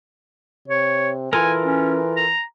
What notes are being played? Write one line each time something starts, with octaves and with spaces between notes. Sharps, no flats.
C3 C#5
E3 F4 A4 A#4 G#5
C#4
A#5